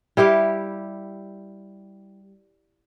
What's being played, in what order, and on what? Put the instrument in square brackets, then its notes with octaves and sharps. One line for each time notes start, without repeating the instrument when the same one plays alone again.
[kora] G3 E4 G4 F5